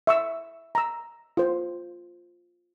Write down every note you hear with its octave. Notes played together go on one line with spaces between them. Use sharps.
E5 C#6 E6
A#5 E6
F4 C5